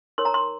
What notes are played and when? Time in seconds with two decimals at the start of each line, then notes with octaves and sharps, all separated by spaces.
0.18 D#4 A#4 C#5 C6
0.25 A#5
0.34 C6